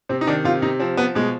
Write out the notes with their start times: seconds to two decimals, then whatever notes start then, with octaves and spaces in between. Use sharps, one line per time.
0.09 C3 C4
0.21 D#4
0.27 D#3 D4
0.44 C3 F4
0.62 C3 D#4
0.80 F3 C4
0.97 F3 B3
1.15 B2 G#3